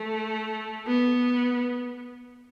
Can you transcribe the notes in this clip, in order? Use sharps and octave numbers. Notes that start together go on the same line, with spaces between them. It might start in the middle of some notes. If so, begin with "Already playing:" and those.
Already playing: A3
B3